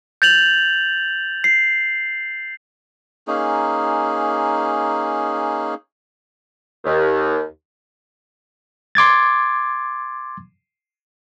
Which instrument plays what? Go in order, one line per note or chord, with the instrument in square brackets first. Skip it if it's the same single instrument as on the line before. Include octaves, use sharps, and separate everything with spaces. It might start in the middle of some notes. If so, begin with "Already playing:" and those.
[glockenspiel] G6 A6 F7 F#7
C7
[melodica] A#3 C#4 D#4 G#4
[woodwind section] D#2
[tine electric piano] C6 D6 G#6 A6